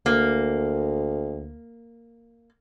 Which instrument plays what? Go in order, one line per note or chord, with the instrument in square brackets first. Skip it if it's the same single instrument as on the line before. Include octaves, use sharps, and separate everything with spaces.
[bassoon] D2 [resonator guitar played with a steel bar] A#3